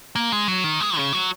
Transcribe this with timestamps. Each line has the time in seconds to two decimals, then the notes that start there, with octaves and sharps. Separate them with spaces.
0.16 A#3
0.32 G#3
0.48 F#3
0.64 D#3
0.81 G#3
0.97 C#3
1.13 F#3